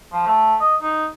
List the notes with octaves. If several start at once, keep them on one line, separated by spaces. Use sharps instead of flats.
F3
A3
D#5
D#4